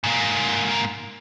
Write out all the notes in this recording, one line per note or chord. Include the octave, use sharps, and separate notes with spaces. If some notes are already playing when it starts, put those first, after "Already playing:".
G#2 A#3